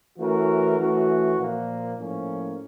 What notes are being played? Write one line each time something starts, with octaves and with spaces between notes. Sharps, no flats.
E3 A3 C#4 F#4 A#4
E3 A3 C#4 F#4
A#2 F3 A#3
A2 F3 A#3 C#4